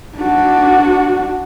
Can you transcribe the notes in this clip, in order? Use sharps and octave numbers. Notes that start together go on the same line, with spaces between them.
D4 F#4